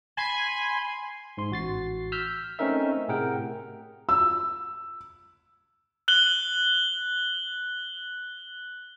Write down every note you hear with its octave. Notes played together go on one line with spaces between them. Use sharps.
G#5 B5 C6
G#2 C6
A1 F#4 A6 C7
E6 F6 G6 B6
A3 C4 C#4 D#4 A#4 E5
A2 C3 G#4 A#4 F#5 G5
E6
F#6 F#7 G7